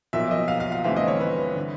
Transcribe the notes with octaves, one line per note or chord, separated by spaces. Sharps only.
B1 A#2 F3 A#3 E5
D#5
F5
F5
F5
G1 G2 E3 A3 C4 E5
D#5
C#5
B4
D3